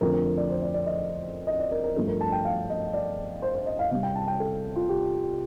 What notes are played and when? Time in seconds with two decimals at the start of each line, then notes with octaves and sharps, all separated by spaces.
0.01 F2 D3 F3 A3 A#4
0.13 A#4
0.25 A#4
0.37 D5
0.50 C5
0.62 D5
0.74 D5
0.86 D#5
1.47 D#5
1.59 D5
1.72 A#4
1.84 A#4
1.96 G2 F3 A3 A4
2.08 A#4
2.21 A5
2.32 G5
2.45 F5
2.70 D#5
2.93 D5
3.42 C5
3.55 C5
3.66 D#5
3.79 F5
3.91 C3 G3 C4 F5
4.03 G5
4.15 A5
4.28 G5
4.40 A4
4.76 F4
4.89 G4